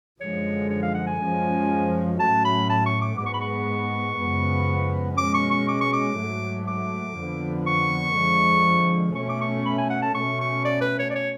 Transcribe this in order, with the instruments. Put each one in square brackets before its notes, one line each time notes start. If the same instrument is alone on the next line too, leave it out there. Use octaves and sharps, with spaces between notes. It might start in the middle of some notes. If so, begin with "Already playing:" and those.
[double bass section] F#2 D3 F3 G#3 [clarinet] C#5
[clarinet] C#5
F5
F#5
G#5
[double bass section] F#2 F3 G#3 C#4
[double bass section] A2 F#3 A3 C#4 [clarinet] A5
[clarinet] B5
A5
C#6
D6
[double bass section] G#2 G#3 B3 [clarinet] D6
[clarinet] C#6
B5
C#6
[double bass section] F#2 C#3 F3 G#3 B3
[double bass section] B2 G#3 C#4 [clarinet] D6
[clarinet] C#6
C#6
D6
C#6
D6
[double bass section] G#2 F#3 A3
[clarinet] D6
[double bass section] F2 D3 F3 B3
[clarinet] C#6
[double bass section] F2 D3 F3 G#3
[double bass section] B2 A3 C#4 [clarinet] C#6
[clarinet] D6
C#6
B5
G#5
F#5
A5
[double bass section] B2 A3 C#4 [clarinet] C#6
[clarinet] C#6
D5
B4
C#5
D5
C#5